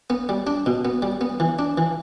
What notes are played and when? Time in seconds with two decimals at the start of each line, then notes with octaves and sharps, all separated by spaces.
0.10 B3
0.29 G3
0.47 D4
0.66 B2
0.85 B3
1.02 G3
1.21 B3
1.40 E3
1.59 D4
1.78 E3